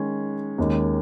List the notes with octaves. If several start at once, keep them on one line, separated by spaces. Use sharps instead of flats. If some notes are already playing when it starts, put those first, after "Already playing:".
Already playing: D#3 G#3 C#4
D#2 D#3 G#3 C#4 A#4